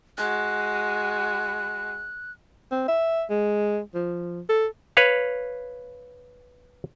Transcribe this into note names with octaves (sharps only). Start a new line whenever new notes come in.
G#3 F#4 F#6
C4
E5
G#3
F3
A4
B4 C#5 F5